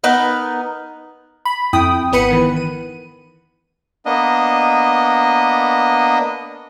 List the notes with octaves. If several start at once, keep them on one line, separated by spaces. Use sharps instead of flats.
B3 D#4 A#4
B5
F2 E4 G5 D#6
G#1 B3 B4 B5 C#7 D#7
D#3 E3
D#7
A#3 B3 D4 D#5